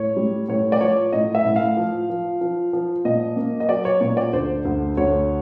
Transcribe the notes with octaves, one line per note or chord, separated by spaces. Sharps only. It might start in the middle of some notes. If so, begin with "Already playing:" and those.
Already playing: A2 C#5
G3
A2 C#5
D5
F3 C#5
A2 D#5
E5
A2
F5
F3
F3
F3
F3
A#2 D#5
A#3
D#5
F#3 D5
C#5
A#2 C#5
D5
D2 C5
D2
D2 C#5